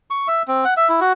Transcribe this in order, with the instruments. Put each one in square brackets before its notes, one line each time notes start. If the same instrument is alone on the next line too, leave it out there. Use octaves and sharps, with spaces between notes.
[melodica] C#6
E5
C4
F#5
E5
E4
F#4